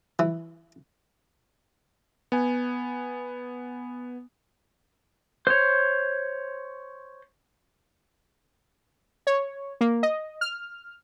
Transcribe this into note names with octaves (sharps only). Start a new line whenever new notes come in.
E3
B3 G#5
C5 C#5
C#5
A#3
D#5
F6